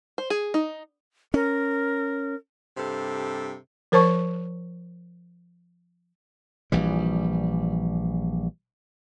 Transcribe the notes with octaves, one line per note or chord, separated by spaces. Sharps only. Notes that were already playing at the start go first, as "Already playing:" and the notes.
C5
G#4
D#4
C#4 A#4
G2 C3 A4
F3 A#4 C5 A5 C#6
A#1 E3 G3